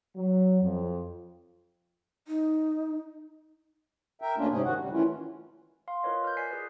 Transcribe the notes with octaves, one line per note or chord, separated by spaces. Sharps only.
F#3
F2
D#4
A#4 E5 G5
D2 A3 A#3 C#4 D4 F4
G#2 C3 C#4 G#4
D2 D#3 F#4 F#5
C#3 G3
D#3 E3 A3 C#4 E4 F4
F5 C6
F4 A#4 B4 C#5 D#5
F6 G6
D5 G#5 B6 C7
G#4 B4